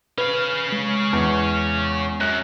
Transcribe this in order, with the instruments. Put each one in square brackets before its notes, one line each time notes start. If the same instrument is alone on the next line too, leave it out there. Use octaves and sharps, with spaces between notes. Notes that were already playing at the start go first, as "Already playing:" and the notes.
[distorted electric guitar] C#4 F5 [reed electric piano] B4
[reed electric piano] G#3
[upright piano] E2
[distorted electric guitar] F#2 [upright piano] F#6